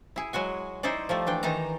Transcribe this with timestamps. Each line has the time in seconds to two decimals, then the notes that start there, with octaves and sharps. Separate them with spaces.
0.16 E4 G#4
0.33 F#3 G#3 F#4 G#5
0.83 D#4 E4 G#4 C5 D5
1.09 F3 G3 A3
1.27 E3 D4 G5
1.43 D#3 E3 D#4 A5 A#5